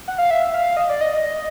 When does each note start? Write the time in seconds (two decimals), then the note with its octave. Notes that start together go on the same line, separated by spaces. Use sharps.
0.08 F#5
0.18 F5
0.31 E5
0.54 F5
0.77 D#5
0.89 D5
1.01 D#5